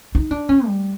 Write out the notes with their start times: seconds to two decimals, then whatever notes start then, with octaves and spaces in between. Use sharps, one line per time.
0.15 D#4
0.31 D4
0.49 C#4
0.66 G3